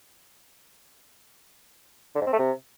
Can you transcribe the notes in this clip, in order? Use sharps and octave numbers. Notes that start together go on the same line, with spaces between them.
D3
G#2
C4
A3
C3